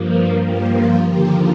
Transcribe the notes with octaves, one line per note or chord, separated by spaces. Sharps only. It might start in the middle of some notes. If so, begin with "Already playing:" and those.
Already playing: G2 F3 A#3
G2 F3 A#3 G4
F4
D#2 D3 F3 A#3 G4